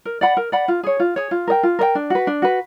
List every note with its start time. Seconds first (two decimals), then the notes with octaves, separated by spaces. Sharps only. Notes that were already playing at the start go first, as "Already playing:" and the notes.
0.05 A#4
0.21 D5 F#5 B5
0.37 A#4
0.52 D5 F#5 B5
0.68 F4
0.83 G#4 C#5
1.00 F4
1.16 G#4 C#5
1.31 F4
1.48 A#4 D#5 G5
1.63 F4
1.79 A#4 D#5 G5
1.95 D4
2.10 F#4 B4
2.27 D4
2.42 F#4 B4